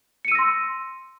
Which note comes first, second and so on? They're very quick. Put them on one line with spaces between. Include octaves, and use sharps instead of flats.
C#7 D#7 E6 A#6 C6